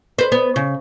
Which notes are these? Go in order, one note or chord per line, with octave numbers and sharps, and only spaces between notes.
B4 C5
B3
C#3